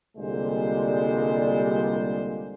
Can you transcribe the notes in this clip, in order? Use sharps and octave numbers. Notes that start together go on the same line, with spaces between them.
C2 A#2 D3 G3 G#3 C5